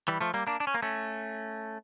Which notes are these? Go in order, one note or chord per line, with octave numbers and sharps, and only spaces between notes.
E3 G3
F3 A3
G3 A#3
A#3 D4
D4
C#4
A#3
A3 C#4